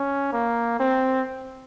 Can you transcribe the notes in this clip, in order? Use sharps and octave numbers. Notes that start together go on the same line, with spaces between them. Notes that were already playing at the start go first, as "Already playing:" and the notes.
Already playing: C#4
A#3
C4